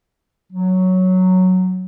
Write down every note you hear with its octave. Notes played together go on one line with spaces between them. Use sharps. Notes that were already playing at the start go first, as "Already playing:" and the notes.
F#3